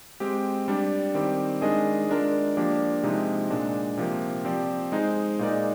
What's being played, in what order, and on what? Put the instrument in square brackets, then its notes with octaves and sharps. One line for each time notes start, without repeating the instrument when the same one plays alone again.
[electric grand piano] G#3 C4 G4
G3 D4 G4
D#3 G3 C4 G4
D#3 G#3 D4 G#4 D#5
G#3 D4 F4 A#4
F3 A#3 D4 G4
C3 F3 G#3 D#4
A#2 G#3 D4
C3 F3 A#3
F3 C4 G4 D5
G#3 D#4 G#4 C5
A#2 G#3 D#4 A#4 D5